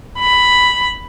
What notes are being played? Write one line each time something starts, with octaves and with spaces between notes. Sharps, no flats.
B5